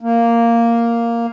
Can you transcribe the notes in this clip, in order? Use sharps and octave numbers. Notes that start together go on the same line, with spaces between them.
A#3